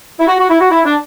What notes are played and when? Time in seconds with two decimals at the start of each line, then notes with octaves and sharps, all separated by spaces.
0.19 E4
0.27 F#4
0.39 F#4
0.49 E4
0.60 F#4
0.70 E4
0.84 D4